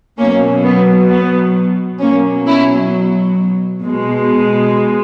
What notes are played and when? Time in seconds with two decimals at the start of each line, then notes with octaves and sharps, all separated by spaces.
0.18 B2 F#3 A#3 C#4
0.64 B3
1.10 B3
2.01 B2 F#3 A#3 C#4
2.47 C#4 E4
3.84 B2 G#3